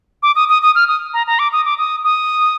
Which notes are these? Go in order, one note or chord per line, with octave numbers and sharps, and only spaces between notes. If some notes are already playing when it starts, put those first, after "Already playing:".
D6
D#6
D#6
D#6
F6
D#6
A#5
A#5
D6
D#6
D6
D#6
D#6